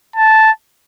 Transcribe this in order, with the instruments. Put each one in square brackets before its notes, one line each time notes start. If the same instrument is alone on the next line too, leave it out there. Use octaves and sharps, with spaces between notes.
[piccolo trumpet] A5